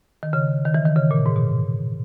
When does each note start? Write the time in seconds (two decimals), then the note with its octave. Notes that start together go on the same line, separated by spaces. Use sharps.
0.23 D#3
0.33 C#3
0.65 D#3
0.74 E3
0.85 D#3
0.96 C#3
1.11 A#2
1.26 G#2
1.36 B2